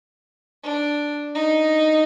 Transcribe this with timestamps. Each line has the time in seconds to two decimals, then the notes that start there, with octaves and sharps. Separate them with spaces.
0.64 D4
1.35 D#4